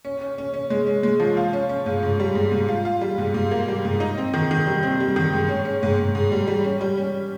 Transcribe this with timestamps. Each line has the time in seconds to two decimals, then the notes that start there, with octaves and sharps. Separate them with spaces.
0.05 C#4
0.21 C#4
0.38 C#4
0.54 C#4
0.70 G#3
0.87 C#4
1.03 G#3
1.20 F3
1.37 F4
1.53 C#4
1.69 C#4
1.86 G#2
2.03 G#2
2.20 G3
2.35 G#2
2.52 G#2
2.69 F4
2.85 F4
3.01 G3
3.18 G#2
3.34 G#2
3.51 A#3
3.68 G3
3.85 G#2
4.00 D#4
4.18 C4
4.34 D#3
4.51 D#3
4.67 G3
4.83 C4
5.00 G3
5.16 D#3
5.33 G#2
5.49 C#4
5.65 C#4
5.83 G#2
5.99 G#2
6.15 G#2
6.32 G3
6.48 G3
6.64 C#4
6.81 G3
6.97 C#4